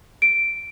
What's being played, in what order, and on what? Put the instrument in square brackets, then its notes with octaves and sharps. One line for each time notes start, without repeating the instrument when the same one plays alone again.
[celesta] D7